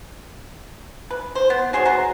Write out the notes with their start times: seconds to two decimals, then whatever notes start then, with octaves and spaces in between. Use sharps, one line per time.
1.11 B4
1.35 C5
1.50 B3
1.73 F#4 G#4 C5 C#5
1.85 F#4 A#5